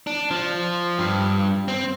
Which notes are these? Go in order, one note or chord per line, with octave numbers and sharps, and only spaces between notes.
D4
F3
G2
C4